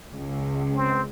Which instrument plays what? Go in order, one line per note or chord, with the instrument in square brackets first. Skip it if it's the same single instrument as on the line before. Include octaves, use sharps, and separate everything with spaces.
[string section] C#2
[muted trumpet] C4